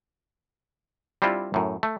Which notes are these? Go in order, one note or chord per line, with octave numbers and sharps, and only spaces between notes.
G3 C4 D4 E4 F4
F#2 A2
A3